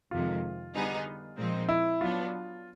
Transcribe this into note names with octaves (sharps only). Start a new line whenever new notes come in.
F2 C3 D#3 G#3 F4
D3 G3 B3 D#4 G#4
A#2 F3 G#3 C4 D#4
E4
F#3 B3 D4 F4